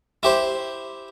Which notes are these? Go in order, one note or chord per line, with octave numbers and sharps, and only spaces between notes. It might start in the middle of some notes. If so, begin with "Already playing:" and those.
E4 G4 C5